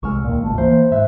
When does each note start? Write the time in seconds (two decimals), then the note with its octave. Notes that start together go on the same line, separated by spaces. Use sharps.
0.03 C2 G#3 C#6 E6 F6
0.24 D#2 A#2
0.44 G#1 C#2 A3
0.58 E3 A#3 C5
0.92 G#2 E5 F#6